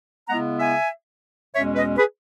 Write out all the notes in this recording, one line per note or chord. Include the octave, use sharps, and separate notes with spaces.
C#3 G#3 B3 E4 F#5 A#5
E5 G#5
E2 B2 G#3 C#4 C#5 E5
B4 D#5
G#4 B4